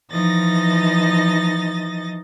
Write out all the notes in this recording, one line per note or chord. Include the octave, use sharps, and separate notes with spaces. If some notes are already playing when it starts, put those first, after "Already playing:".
E3 F3 D#4 D#5 A6 A#6